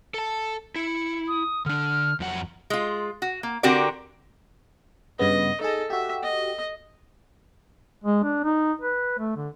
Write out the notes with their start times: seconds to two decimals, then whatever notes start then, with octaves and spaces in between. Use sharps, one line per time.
0.14 A4 A5
0.76 E4 C#7
1.28 D#6
1.66 D3 D4 F6
2.20 F2 F#3 F#5
2.70 G#3 F4
3.22 F#4
3.43 A#3
3.63 D3 C4 F#4 G4 A#4 D5
5.19 G2 C#3 B3 D#5
5.61 D#4 G#4 A4 D#5
5.90 F#4 G4 E5
6.23 D#5
8.04 G#3
8.24 D4
8.44 D#4
8.82 B4
9.19 A3
9.36 D3